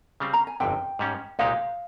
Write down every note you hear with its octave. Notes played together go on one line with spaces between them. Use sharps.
C#3 G3 C4
A#5
G#5
G1 F2 C3 G5
G#2 G3 C#4
C2 A#2 G#3 D#4 G4 F5